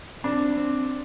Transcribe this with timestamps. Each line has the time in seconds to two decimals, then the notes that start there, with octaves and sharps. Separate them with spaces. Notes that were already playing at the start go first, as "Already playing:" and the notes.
0.24 C4 D4
0.57 C4